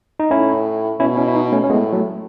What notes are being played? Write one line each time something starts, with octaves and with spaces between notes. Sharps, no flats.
D#4
A2 C#4 E4
B2 C#4 E4
C#4 E4
E4
B3 D#4
A3 C#4
C#4
A2 G#3 B3
F#3 A3